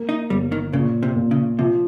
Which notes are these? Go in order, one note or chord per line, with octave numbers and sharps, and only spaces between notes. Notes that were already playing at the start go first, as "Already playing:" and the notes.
Already playing: A#3
D#4
G1 G3
D#3
A#2 C#3
C3
A#2
C#3
C3 F3